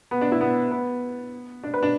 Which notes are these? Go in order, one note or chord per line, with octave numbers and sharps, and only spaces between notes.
B3
D4
E4
B3
B3
D4
B4
D4